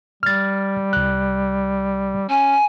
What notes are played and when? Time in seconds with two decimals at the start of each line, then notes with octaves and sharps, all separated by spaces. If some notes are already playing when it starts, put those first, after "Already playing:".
0.23 G3 F6 A6
0.93 C2 F#6
2.29 C#4 G#5